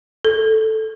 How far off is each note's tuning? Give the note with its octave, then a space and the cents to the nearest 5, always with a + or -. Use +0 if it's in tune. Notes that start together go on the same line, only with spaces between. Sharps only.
A4 +0